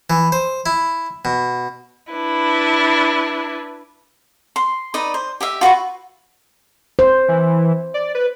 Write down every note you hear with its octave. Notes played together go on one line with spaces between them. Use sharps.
E3
C5
E4
B2
D4 E4 B4
C6
D#4 B4 D5 D#5
C5
G4 D#5 E5
F4 F#4 B4 C#6
C5
E3
D5
B4